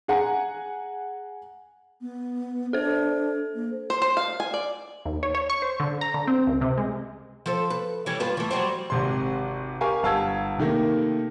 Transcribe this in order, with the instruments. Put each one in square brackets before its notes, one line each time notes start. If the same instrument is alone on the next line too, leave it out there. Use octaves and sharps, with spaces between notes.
[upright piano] G#4 F#5 G#5 A#5
[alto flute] B3
[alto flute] D4 [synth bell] A4 C5
[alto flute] A#3
[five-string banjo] C5
C5
F5
G#5
D5
[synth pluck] D#2
C#5
C#5
C#6
C5
D3
A#5
D3
C4
C#2
C3
G#3
[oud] F3 A4 C5
B4
E3 G3 C#5
G2 F4 B4
E3 A3
F#3 G3 C5
[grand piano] G#1 C3 C6
G4 A#4 F5 G#5 C#6
G1 F5 A5 E6 G#6
C3 D#3 A3 A#3